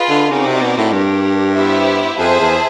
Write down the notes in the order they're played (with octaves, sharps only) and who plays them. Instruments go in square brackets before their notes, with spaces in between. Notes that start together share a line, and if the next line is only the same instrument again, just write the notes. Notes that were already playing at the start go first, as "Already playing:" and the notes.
Already playing: [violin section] F4 G#4 B4 D#5
[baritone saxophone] D3
[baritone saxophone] C#3 [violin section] C4 D#4 F#4 A#4 D5
[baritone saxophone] C3
B2
A2
[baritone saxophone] G2 [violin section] D4 G4 A#4
[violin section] B3 E4 G4 C5 E5
[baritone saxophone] F2 [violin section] G#4 C5 E5 A5
[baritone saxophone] E2